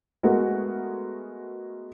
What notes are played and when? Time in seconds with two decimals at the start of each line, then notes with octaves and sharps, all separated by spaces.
0.23 G#3 A3 B3 F#4 A#4